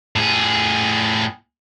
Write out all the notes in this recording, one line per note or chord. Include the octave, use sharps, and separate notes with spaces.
A2 G#4